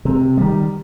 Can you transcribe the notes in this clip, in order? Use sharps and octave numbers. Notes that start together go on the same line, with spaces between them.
C3
D#3 G3